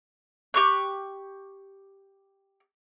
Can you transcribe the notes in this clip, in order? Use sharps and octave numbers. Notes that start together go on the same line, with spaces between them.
G4 C#6 F#6